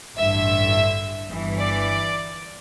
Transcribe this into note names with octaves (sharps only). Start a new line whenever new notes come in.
A1 G2 D3 E5
G1 G2 E3
D5